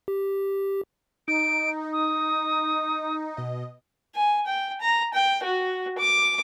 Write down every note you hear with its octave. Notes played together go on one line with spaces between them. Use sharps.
G4
D#4 D7
D#6
B2 D#5
G#5
G5
A#5
G5
F#4
D6